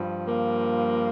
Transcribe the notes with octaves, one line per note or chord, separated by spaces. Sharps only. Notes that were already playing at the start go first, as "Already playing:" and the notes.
Already playing: G2 F3
A#3